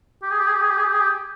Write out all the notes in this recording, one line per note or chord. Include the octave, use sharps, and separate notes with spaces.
G4
G#4
G4
G#4
G4
G#4
G4
G#4
G4
G#4
G4